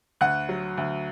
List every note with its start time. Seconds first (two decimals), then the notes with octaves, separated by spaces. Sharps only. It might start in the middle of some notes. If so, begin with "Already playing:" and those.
0.21 D2 F#5 F#6
0.49 F#3
0.78 D2